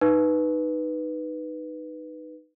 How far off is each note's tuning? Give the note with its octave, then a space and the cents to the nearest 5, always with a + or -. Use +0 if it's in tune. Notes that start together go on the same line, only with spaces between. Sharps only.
D#4 -10 B4 +0